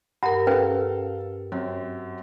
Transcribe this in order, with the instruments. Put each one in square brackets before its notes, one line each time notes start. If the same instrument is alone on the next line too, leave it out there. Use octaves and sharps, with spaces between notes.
[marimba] G2 A#4 [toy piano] F#5 A#5
[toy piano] C#4 B4 G5 [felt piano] A4 F5
[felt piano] F#2 C4